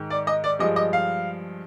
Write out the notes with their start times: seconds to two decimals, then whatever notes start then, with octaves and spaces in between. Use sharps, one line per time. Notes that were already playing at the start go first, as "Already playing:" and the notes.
Already playing: G#2 D#3 G#3
0.10 D5
0.27 D#5
0.44 D5
0.59 G2 F3 G#3 D#5
0.76 D#5
0.93 F5